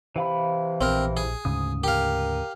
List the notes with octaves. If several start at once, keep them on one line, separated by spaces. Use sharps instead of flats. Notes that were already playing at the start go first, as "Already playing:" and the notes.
C3 E3 F5 B5
A#1 C4 A#4
G#4
D2 G#2 C#3 D#6
G4 A#4 F5